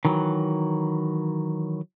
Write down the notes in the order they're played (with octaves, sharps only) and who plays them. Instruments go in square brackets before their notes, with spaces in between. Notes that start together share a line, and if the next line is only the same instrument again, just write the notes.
[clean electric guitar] D#3 E3 F#3